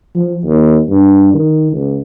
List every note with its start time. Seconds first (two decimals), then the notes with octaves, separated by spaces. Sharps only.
0.15 F3
0.45 D#2
0.89 G2
1.34 D#3
1.73 C#2